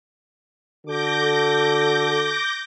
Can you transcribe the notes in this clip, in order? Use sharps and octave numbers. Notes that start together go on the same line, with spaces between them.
D3 F#4 A4 D6 G6 A#6